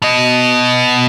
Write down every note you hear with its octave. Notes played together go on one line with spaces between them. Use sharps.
B2 D#5